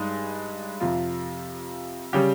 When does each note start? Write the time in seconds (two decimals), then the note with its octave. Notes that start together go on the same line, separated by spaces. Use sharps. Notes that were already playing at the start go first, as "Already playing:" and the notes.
Already playing: G2 G#3 D#4
0.80 F2 C3 F3 F4
2.13 C#3 G3 G4